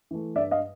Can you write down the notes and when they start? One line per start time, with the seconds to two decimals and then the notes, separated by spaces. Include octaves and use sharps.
0.11 E3 A3
0.35 G2 D5 E5
0.51 D#5 F5